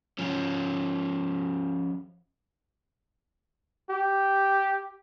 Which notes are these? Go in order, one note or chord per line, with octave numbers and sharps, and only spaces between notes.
F3 C#4
G4